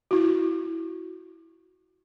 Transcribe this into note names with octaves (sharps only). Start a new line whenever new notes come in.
E4 F#4